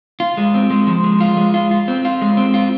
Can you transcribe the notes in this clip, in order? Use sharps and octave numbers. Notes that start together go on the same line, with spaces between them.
F4
G#3
C4
G#3
F3
G#3
F4
G#3
F4
F4
C4
F4
G#3
C4
F4